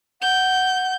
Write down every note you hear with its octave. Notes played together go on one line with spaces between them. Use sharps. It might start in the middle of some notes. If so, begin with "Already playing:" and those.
F#5 G6